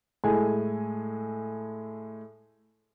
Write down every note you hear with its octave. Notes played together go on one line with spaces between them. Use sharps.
A2 G#3 A4 G#5